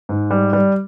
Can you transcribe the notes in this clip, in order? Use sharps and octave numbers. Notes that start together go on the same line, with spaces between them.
G#2
G3
G3